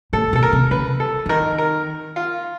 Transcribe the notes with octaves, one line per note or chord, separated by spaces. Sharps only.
A2 A4
B2
A4
A#4
C3
C#3 B4
A4
D3
D#3 A#4
A#4
F4